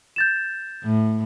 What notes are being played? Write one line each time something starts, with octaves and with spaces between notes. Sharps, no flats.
G6 A6 E7
A2